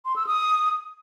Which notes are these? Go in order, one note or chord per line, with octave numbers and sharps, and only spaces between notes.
C6
E6
D#6